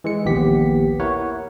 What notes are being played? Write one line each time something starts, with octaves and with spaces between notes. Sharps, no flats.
E3 G#3 C#7
A#1 D#2 B3 G4 B6
E4 A#4 C#5 F#5